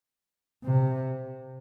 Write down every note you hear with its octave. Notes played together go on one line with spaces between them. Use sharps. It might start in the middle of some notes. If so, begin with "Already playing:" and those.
C3